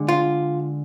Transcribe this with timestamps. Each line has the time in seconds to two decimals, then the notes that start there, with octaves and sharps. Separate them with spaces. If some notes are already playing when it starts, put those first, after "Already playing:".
Already playing: D3 G#3
0.08 F4